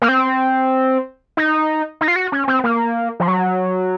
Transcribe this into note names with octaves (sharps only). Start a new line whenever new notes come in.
A#3
C4
D#4
D#4
F4
F#4
C#4
C4
A#3
F3
F#3